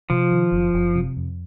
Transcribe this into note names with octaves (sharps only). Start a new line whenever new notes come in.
C3 F3
D#3
F#1
F#1
C3
F2